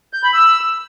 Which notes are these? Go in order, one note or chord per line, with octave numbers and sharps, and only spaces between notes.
G6
B5
E6